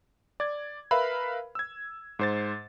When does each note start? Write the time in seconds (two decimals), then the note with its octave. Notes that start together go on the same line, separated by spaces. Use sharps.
0.40 D5 G#6
0.91 A#4 B4 E5 F5 B5
1.55 E6 G#6
2.19 G#2 C5 A6